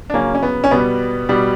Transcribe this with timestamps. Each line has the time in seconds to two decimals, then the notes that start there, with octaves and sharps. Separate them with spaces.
0.10 D4
0.14 C#3 F#3 A#3 C#4
0.35 C#4
0.43 B3
0.64 C#4
0.71 B2 G3 B3
1.29 B2 G3